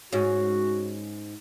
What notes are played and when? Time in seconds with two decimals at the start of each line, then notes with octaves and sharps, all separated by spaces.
0.12 G#2 C#4 F#4